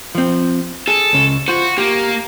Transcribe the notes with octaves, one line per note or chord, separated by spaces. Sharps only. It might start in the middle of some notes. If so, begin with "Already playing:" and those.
F3 C4
G#4 A4
C#2 C#3
F4 F#4 C5
A#3 G4